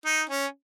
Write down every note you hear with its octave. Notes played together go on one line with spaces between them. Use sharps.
D#4
C#4